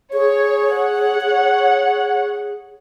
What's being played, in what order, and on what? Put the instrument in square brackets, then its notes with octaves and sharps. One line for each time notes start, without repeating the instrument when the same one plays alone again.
[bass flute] G#4 [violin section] C#5
[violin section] C#5 F#5
[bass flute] G#4